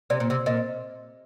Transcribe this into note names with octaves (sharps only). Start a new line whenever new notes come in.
C3 D5
A#2
C3
A#2 D#5